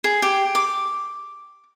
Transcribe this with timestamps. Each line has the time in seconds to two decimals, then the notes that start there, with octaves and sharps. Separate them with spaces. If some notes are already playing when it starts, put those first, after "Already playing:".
0.04 G#4
0.22 G4
0.55 D6